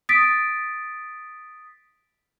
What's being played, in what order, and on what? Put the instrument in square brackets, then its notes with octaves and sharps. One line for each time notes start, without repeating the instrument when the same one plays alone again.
[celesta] D#6 A6 B6 D7